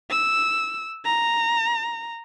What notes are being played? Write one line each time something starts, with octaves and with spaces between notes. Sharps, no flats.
E6
A#5